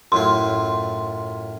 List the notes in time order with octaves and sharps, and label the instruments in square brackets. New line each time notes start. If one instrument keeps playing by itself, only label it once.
[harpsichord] F#2 A2 F4 [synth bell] C6